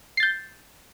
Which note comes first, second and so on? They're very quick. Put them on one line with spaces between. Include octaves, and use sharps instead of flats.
C7 A6 G6